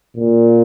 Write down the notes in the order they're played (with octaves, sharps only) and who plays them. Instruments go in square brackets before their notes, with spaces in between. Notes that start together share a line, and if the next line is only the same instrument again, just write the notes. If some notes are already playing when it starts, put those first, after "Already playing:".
[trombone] A#2